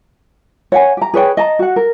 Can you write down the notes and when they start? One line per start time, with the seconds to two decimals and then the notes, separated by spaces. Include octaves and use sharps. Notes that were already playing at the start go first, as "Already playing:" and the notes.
0.72 C#5 F#5 G#5
0.97 G4 A#5
1.14 G#4 B4 C#5 G5
1.37 D#5 A5 A#5
1.59 F#4 F#5
1.76 A#4